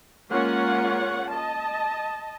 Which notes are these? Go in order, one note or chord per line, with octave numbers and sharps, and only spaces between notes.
G#3 A#3 C#4 F4 C#5 F#5
D#5 A5